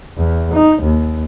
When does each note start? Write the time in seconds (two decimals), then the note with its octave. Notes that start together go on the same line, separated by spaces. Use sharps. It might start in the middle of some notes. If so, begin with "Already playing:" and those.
0.18 E2
0.54 D#4
0.83 D#2